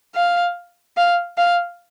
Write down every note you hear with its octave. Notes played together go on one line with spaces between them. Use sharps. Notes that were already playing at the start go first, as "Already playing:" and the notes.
F5
F5
F5